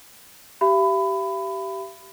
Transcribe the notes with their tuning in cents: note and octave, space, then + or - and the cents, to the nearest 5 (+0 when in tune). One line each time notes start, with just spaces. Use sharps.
G4 -20 E5 +40 B5 +20